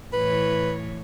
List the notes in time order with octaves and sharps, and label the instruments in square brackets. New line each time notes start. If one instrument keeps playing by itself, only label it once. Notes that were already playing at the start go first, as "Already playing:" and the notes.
[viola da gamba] A2 E3 C#5 [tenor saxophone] B4